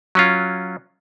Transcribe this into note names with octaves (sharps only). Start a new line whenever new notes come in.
F#3 C#4 F4